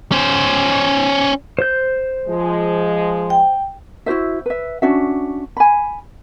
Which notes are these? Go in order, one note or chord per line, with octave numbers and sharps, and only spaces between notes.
C#4 C5
C5 G6
F3 G#3
G5
E4 F#4 C5 E5
B4 E5
C#4 D4 F#4 E5
G#5 B5